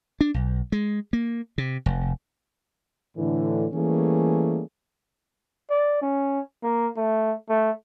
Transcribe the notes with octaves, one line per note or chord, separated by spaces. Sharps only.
D4
B1
G#3
A#3
C3
F1
A2 D3 E3
E3 G3 A3 A#3 C#4 G#4
D5
C#4
A#3
A3
A3